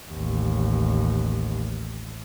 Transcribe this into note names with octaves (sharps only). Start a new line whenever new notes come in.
A1 D#2